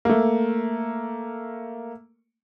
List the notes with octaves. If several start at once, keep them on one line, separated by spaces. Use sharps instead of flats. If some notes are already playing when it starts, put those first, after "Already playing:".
A3 A#3